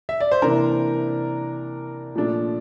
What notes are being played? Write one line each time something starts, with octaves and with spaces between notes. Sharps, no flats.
E5
D5
C5
C3 E3 A#3 D4 A#4
A#2 F3 A3 D4